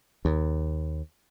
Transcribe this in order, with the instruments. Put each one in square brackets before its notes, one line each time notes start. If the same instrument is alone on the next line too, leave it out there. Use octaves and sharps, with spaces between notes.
[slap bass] D#2